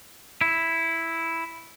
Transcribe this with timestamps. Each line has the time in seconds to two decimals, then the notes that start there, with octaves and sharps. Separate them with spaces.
0.41 E4